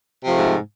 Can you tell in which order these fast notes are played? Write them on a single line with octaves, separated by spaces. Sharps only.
C3 F3 A3 G#2